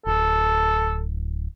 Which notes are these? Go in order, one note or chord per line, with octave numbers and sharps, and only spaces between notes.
D1 A4